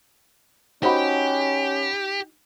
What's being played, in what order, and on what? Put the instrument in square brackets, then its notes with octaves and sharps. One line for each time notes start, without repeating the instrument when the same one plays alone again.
[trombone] C#4 [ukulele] D#4 F#4 [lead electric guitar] G4 [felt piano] C5 F#5 B5